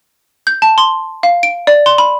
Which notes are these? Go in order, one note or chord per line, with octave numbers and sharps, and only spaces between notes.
G6
A5
C6
F5
D7
D5
C6
B5